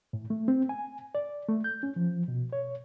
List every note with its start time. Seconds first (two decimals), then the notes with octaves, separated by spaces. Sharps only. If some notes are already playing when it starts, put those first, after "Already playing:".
0.13 A2
0.30 A3
0.48 C4
0.69 G#5
1.15 D5
1.49 A3
1.64 G6
1.83 C#4
1.96 F3
2.28 B2
2.53 C#5